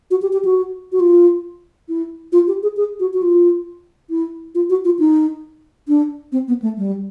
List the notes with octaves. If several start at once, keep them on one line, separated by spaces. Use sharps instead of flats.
F#4
G4
G4
F#4
F#4
F4
E4
F4
G4
G#4
G#4
F#4
F#4
F4
E4
F4
F#4
F4
D#4
D4
C4
B3
A3
G3